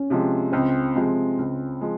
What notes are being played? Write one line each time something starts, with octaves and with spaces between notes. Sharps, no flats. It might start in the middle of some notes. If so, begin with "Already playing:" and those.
Already playing: C#4
C3 F3 G#3
C#2 C4
C3 F3 G#3
C#2
F3 G#3